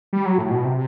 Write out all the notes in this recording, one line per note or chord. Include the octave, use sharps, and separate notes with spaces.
G3
F#3
A2
B2
C3